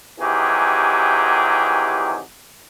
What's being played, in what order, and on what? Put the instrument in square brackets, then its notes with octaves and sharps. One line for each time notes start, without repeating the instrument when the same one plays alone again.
[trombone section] C3 D#3 E3 F#3 G4 G#4